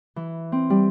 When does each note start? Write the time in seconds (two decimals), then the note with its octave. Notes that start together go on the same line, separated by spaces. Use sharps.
0.16 E3
0.52 C4
0.70 G3